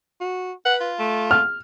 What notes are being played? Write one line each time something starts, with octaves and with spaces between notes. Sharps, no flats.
F#4
B4 F#5
F4
A3
F6